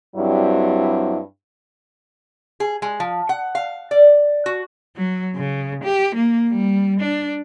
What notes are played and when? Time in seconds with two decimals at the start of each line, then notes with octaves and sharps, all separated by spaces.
0.16 G2 F#3 G3 C4 E4
2.60 G#4
2.82 G#3
3.00 F3
3.29 F#5
3.55 F5
3.91 D5
4.46 F#4
4.96 F#3
5.36 C#3
5.84 G4
6.15 A#3
6.49 G3
7.01 D4